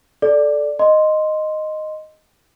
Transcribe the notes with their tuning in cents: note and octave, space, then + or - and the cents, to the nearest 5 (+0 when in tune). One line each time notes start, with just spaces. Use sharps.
A4 -10 D5 +0
D#5 -5 C6 +0